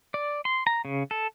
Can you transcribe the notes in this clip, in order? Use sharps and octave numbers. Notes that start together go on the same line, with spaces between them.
D5
C6
A#5
C#3
A4